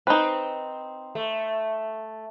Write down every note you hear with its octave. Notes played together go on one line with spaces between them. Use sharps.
C4 D#4 B4
A3